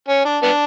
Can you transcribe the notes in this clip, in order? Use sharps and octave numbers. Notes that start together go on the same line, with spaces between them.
C#4
D4
B3 D4